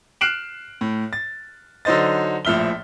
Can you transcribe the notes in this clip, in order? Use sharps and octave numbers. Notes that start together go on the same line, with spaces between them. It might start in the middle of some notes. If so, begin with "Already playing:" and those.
F6 F#6 C7 D7 E7 F#7
A2
A6
D3 F#3 D#4 C5 D#5 A6
A#1 A2 F3 E5 F6 G7